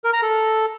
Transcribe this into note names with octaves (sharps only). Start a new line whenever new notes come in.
A#4
A#5
A4